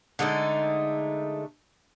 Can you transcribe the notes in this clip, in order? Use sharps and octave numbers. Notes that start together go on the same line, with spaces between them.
D3 G#3 A3 D#4